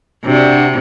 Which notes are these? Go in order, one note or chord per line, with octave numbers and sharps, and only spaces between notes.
C3 D4 F#4